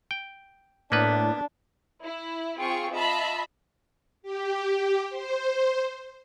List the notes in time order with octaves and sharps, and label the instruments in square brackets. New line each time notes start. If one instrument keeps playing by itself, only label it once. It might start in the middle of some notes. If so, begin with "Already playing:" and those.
[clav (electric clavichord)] G5
[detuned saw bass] A2 [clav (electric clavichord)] A#3 B3 B4 [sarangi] D4
[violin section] E4
C4 F4 G#4 G5 C#6
F4 D#5 E5 A5 B5
[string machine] G4
C5